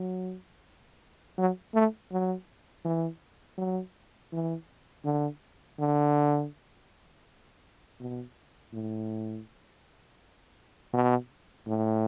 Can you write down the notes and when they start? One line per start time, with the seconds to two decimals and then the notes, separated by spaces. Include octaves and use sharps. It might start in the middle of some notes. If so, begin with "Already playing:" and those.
Already playing: F#3
1.38 F#3
1.74 A3
2.11 F#3
2.85 E3
3.58 F#3
4.32 E3
5.05 D3
5.79 D3
8.00 B2
8.73 A2
10.93 B2
11.67 A2